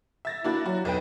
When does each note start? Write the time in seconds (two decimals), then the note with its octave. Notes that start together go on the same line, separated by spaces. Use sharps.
0.25 E5 A6 A#6
0.44 A#3 D4 E4 F#4
0.66 F#3 F#4
0.85 B1 E2 B4 G5